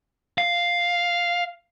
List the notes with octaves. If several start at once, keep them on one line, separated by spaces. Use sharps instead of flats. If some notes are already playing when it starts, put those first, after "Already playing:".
F5